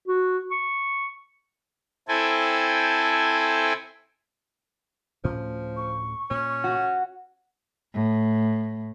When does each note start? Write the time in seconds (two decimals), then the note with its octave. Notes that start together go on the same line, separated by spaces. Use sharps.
0.07 F#4
0.51 C#6
2.08 C4 E4 A4 G5 G#5
5.24 D2 A2 F3 C#4
5.77 C#6
6.31 A#2 C#4
6.64 F#4
7.94 A2